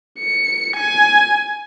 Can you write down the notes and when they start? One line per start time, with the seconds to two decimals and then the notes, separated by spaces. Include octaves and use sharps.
0.19 C#7
0.76 G#5